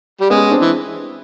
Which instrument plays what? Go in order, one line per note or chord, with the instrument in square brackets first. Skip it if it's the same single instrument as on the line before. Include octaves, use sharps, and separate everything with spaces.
[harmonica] G3
[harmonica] G#3 [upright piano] B3 C#4
[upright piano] C4 D4
[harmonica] E3